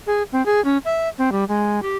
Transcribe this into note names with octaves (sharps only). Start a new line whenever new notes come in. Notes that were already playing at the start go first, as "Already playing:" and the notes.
G#4
C4
G#4
C#4
E5
C4
G3
G#3
G4